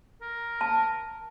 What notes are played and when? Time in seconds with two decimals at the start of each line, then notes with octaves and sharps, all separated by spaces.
0.22 A#4
0.61 A5